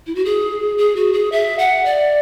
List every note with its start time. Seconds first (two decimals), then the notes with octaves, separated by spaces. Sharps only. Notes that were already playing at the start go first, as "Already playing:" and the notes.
0.07 E4
0.15 F#4
0.25 G#4
0.78 G#4
0.96 F#4
1.13 G#4
1.32 E5
1.59 F#5
1.85 D5